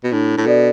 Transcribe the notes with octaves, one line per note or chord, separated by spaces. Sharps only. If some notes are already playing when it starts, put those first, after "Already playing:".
B2
A2 D4
A2
B2 A4 D5